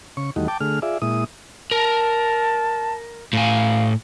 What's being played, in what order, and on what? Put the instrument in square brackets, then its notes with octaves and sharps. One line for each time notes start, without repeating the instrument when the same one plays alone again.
[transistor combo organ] C#3 C#6
E2 D#3 G3 A3 D#4 F#4
G5 A5 D6
D3 A3 G#4 F6
F4 G#4 D5 E5
A#2 G#3 E4 D#6
[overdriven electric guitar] A#4 [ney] A5
[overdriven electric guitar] A2 G#5 [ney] F5